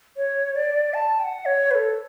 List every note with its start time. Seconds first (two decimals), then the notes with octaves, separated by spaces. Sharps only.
0.17 C#5
0.56 D5
0.94 A5
1.20 G5
1.24 F#5
1.46 C#5
1.71 B4
1.75 A4